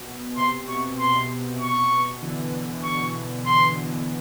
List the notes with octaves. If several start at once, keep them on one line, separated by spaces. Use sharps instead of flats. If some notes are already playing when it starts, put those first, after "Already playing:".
Already playing: B2
C3 C6
B2 C#6
B2 C6
C#6
D3 E3
C#6
C6